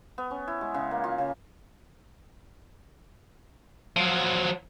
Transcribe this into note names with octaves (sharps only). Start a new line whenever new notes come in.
B3
C#4
E4
G#3
C#3
A#3
F4
C#3
F3 F#3